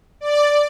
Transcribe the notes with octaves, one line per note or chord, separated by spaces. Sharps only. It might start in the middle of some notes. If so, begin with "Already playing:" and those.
D5